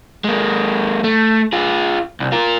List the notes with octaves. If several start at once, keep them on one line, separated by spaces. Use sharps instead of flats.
G#3 A#3
A3
F4 G#4
C2
F4 A#4